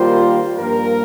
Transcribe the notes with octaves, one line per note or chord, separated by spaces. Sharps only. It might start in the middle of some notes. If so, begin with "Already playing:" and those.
Already playing: D#3 G3 A#3 F4 C5
G2 F3 A#3 A#4